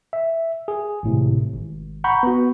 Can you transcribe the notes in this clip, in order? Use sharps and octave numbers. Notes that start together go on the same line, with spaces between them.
E5
G#4
G#1 A2 C3
G#1
F#5 A#5 B5 C#6 G6
B3 F#4